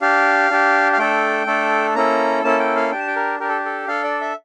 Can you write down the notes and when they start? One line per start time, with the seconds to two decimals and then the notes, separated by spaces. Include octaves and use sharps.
0.01 D4 G4 F5
0.50 D4 G4
0.93 F5
0.98 A3 D4 A4 G5
1.47 A3 D4 A4
1.95 A#3 C#4 E4 A4 A#5
2.44 A#3 C#4 E4 A4 A5
2.60 G5
2.76 F5
2.91 D4 G4 G5
2.99 A5
3.07 G5
3.16 A#4
3.40 D4 G4 A#4
3.49 A4
3.65 A4
3.88 D4 A4 F5
4.04 D5
4.21 E5